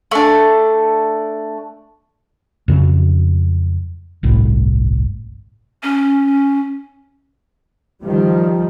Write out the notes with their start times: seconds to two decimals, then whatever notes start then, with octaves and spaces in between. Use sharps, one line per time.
0.11 A3 D4
2.68 F2 C#3 F#3
4.23 G1 C2 A2
5.83 C#4
8.04 D#3 F3 G3